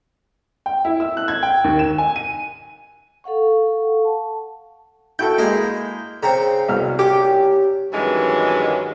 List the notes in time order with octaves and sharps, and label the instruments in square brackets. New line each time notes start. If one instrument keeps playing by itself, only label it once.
[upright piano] G5
E4
E6
F#6
G#6
G5
D#2
E7
G#5
D#7
[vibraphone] A4 F5 F#5 C#6
A5
[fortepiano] E4 F#4 A4 [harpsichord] G5 [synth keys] G6
[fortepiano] G#3 A#3 [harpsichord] E4 D#5 F5
[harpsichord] C#3 C4 C#6 [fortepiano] A#5
[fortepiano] C2 B2 F6
[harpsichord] C#4 [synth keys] G4
[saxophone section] G2 D#3 E3 F#3 G#3 C#4